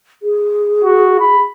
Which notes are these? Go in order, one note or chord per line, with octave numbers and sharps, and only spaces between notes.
G#4
F#4
B5